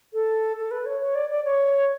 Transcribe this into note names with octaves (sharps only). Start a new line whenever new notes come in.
A4
A4
B4
C#5
C#5
D5
D5
C#5